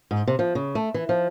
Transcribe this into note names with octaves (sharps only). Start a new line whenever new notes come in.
G#2
C3
F3
C#3
A3
E3
F3